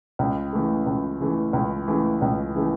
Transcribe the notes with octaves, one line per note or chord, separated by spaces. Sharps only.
C#2
C#3 E3 A3
C#2
C#3 E3 A3
C#2
C#3 E3 A3
C#2
C#3 E3 A3